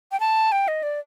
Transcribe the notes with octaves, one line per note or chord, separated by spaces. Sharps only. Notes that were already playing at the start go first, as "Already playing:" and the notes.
G5
A5
G5
D#5
D5